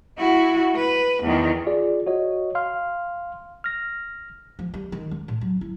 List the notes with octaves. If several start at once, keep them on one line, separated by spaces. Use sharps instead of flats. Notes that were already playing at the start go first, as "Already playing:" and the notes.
E4 F#4
B4
E2 D#3
F4 G#4 D5
F#4 C#5 D#5
F5 C6 F6
F6 A#6
F3
G3
D#3
C#2
A2
F#3
E4